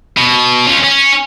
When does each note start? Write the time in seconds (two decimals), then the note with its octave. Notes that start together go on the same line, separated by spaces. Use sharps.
0.17 B2
0.67 C#4 F4
0.84 C#4